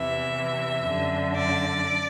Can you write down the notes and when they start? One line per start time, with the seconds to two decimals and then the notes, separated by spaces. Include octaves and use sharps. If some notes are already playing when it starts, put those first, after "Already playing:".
Already playing: E2 C3 E3 E5
0.85 F#2 D3
1.34 D5